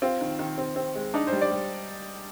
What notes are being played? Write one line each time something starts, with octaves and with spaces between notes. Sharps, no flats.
C4 F4
D#3
D#3
C4
C4
G#3
D4 D#4
C5
G3
D5
G3